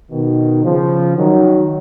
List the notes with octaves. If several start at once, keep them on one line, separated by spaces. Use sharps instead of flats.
B2 D#3
C#3 F3
D#3 F#3